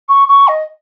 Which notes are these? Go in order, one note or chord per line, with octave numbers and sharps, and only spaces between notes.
C#6
C#6
D#5